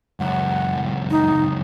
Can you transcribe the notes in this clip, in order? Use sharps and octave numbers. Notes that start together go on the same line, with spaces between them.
C#2 F#2 F#5
D#4